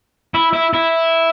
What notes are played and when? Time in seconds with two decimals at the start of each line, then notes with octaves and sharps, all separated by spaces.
0.34 E4
0.53 E4
0.74 E4